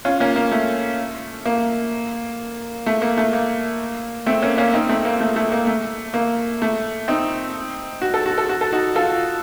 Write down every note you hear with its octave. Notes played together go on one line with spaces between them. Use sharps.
C#4 F4
A#3 C#4
A#3
A3
A#3
A3
A#3
A3
A#3
A3 C4
A#3 C#4
A#3 C#4
C4 D#4
A3 C4
A#3
A3
A3
A#3
A3
A#3
A3
C4 D#4
F#4
A4
F#4
A4
F#4
A4
D#4 F#4
F4 A4